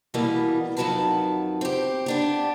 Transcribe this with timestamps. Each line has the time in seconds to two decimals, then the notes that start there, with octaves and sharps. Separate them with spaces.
0.14 B2 E3 G3 A#3 B3
0.77 F2 D#3 F#3 F#4 B4 A5
1.61 C4 G4
2.06 B3 D4 G4